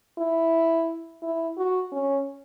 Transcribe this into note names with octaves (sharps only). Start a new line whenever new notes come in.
E4
E4
F#4
C#4